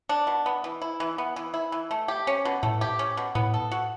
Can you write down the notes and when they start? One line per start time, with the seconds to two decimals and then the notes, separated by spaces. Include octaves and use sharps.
0.09 D4
0.27 B2
0.46 B3
0.64 E3
0.82 E4
1.00 E3
1.18 B3
1.36 E3
1.54 E4
1.72 E3
1.91 A3
2.08 G4
2.27 C#4
2.45 B2
2.63 A2 A3
2.81 G4
2.99 C#4
3.17 B2
3.35 A2 B3
3.54 A4
3.71 F#4